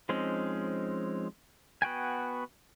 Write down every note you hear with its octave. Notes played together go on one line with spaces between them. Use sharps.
F3 G#3 C4 C#4 D#4
B3 F#4 G5 G#5